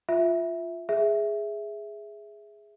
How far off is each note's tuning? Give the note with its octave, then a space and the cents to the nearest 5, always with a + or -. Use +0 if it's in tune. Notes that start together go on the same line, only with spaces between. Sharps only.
F4 +0 E5 +0
G#4 +0 E5 +0